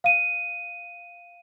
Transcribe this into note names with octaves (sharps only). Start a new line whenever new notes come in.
F5 D#7